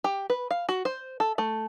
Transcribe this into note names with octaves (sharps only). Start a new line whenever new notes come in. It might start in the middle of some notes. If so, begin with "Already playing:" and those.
G4
B4
F5
F#4
C5
A4
A3